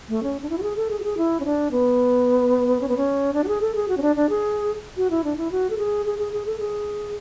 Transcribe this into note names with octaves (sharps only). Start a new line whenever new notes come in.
A3
C#4
D4
E4
F#4
G#4
A4
G#4
F#4
G#4
E4
C#4
D4
B3
C#4
B3
C#4
D4
F#4
G#4
A4
G#4
F#4
C#4
D4
D4
G#4
F#4
E4
D4
E4
F#4
A4
G#4
G#4
G#4
G#4
A4
G#4